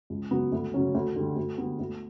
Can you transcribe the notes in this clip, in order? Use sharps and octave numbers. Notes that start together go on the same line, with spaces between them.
C#2
C#3 F#3 B3
D2
C#3 F#3 C#4
D2
D3 G3
D2
D3 G3 B3
D2